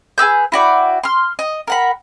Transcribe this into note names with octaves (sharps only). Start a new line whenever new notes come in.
G#4 B4 E6 G6
E4 F#4 D5 G5
C6 F6
D#5
A#4 F#5 B5